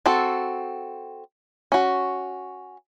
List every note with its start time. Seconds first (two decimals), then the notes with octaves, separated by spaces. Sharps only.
0.06 C4 F#4 A4
1.72 C#4 F#4